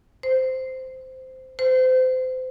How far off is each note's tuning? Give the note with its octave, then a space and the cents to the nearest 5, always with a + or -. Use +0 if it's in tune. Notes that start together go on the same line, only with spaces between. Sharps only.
C5 -10
C5 -30